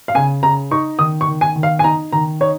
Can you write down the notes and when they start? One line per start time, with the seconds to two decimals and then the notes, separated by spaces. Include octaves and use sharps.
0.08 F5
0.15 C#3 G#5
0.43 C#3 A#5
0.71 D#4 C#6
0.99 D#3 D#6
1.21 C#6
1.28 D#3
1.41 G#5
1.56 D#3
1.63 F5
1.79 G#5
1.84 D#4 A#5
2.12 D#3 A#5
2.41 D#4 C#5